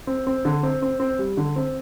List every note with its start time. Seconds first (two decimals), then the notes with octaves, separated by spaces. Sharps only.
0.07 C4
0.27 C4
0.45 D3
0.63 C4
0.82 C4
1.00 C4
1.19 G3
1.37 D3
1.56 C4